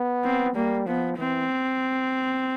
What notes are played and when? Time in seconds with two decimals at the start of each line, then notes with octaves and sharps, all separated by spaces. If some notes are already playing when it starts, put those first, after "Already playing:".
Already playing: B3
0.24 C4
0.55 G3 A#3
0.87 F3 B3
1.18 E3 C4